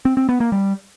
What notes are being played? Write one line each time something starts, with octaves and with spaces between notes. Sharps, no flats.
C4
C4
B3
A#3
G3